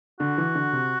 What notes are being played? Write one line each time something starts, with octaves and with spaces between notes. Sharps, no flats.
D3 F#4
E3
D3
C3